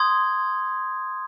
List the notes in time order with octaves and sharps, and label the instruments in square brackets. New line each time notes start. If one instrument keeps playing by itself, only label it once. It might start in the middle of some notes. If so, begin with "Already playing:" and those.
Already playing: [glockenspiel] C6 D#6 G6 G#6